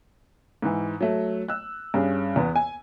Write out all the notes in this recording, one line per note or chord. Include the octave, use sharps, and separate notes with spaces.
G#2 E3
F#3 A3
E6 F#6
G2 C#4 G#4
E2 B3
G#5